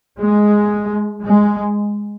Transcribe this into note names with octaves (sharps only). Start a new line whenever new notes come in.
G#3
G#3